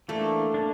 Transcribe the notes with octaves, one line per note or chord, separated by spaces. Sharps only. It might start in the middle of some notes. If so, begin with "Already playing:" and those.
E3 A3 A#3 D4
A#3 D4